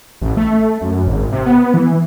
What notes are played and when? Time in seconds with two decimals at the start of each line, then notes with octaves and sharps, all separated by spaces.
0.21 A1
0.37 A3
0.81 F#2
1.07 G#1
1.32 C3
1.46 B3
1.74 E3